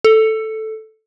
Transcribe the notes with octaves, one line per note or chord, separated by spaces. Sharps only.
A4